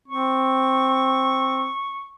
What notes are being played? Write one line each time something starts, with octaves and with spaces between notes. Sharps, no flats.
C4 C#6